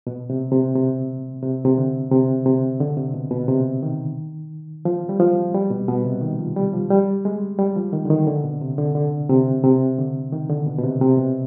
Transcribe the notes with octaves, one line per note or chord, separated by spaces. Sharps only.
B2
C3
C3
C3
C3
C3
D3
C3
C3
D3
C3
B2
B2
C3
D#3
F3
G3
F3
G3
B2
B2
C3
D#3
F3
G3
F3
G3
G#3
G3
F3
D#3
D3
D#3
D3
B2
C3
D3
D3
C3
C3
D3
D#3
D3
B2
B2
C3
C3
B2